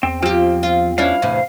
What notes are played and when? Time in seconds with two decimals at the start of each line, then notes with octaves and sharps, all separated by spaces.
0.03 E2 C4
0.22 F3 C4 F4 G4
0.63 F4
0.98 C#4 D4 E4 F5
1.22 E2 A2 C3